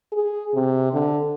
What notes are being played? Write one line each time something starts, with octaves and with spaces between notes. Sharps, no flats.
G#4
C3
D3